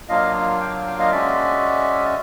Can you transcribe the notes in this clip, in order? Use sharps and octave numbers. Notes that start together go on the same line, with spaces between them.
F#3 A#3 D4 F4 D#5 F5
F5 G5
F5 G5
D#5 F5
G#3 C#4 F#4 D5 E5